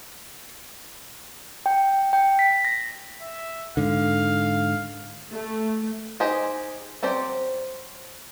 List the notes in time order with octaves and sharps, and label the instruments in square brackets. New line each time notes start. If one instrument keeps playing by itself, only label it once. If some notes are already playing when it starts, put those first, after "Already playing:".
[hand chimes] G5
G5
B6
A#6
[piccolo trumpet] E5
[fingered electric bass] G#2 D3 [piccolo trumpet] F5
[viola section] A3
[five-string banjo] D#4 G4 G#4 C5
F#3 C4 G4 C5 D5